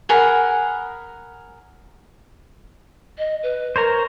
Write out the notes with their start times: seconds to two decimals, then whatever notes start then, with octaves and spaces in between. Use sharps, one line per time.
0.09 G#4 A#4 F#5 B5
3.18 D#5
3.43 B4
3.76 A#4 C5 C#5 A#5